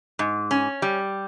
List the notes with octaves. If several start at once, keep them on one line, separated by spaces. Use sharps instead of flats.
G#2
C#4
G3